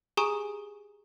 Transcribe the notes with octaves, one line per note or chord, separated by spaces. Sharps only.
G4 G#4 G#5 A#5 C#6 D#6